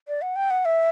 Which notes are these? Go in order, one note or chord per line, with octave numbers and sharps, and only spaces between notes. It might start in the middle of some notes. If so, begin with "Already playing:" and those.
D5
F#5
G5
F#5
E5